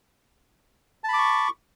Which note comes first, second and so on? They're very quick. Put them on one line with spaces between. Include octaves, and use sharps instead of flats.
A5 B5 D6 C#6